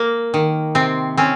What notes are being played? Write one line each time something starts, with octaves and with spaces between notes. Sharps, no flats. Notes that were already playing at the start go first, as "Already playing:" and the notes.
Already playing: A#3
D#3
C3 C4
C4 C#4